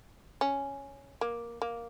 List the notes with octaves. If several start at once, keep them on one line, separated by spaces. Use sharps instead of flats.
C#4
A#3
A#3